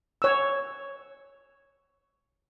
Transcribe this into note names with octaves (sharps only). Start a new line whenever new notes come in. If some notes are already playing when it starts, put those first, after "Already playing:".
C#5 E6